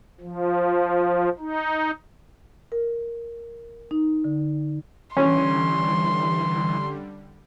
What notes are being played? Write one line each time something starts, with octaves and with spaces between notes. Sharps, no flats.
F3
D#4
A#4
D#4
D3
D3 E3 G3 C#4 C6